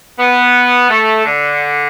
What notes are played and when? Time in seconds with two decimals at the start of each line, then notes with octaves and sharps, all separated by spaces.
0.19 B3
0.89 A3
1.25 D3